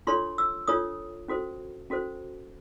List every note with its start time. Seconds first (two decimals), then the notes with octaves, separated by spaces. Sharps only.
0.07 D4 F4 A4 C#5 C6
0.38 E6
0.68 D4 F4 A4 C#5 D#6
1.28 C#4 F#4 A4 C5
1.90 C#4 F#4 A4 C5